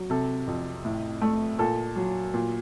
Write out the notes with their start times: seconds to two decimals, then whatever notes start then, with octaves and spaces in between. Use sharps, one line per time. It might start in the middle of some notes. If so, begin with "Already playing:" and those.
Already playing: F#3
0.10 C3 A4
0.47 F2
0.85 A2
1.21 A3
1.58 A#2 A4
1.96 F#3
2.34 A#2